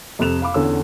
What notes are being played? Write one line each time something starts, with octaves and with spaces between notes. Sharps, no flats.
F2 C3 A4 F#6 E7 F7
F5 B5 D6
E2 D3 C#4 A4 E6